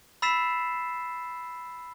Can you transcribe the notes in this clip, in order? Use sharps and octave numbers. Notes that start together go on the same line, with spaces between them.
B5 E6 A6 B6 C7 E7